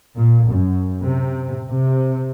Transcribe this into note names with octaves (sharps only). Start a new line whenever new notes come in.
A#2
F#2
C3
C3